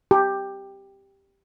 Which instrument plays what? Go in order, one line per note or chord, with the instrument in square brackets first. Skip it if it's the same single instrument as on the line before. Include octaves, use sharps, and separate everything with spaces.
[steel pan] G4